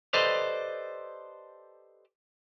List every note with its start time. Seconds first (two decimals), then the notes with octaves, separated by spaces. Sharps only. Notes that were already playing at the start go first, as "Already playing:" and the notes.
0.13 G4 A4 B4 C5 D5 D#5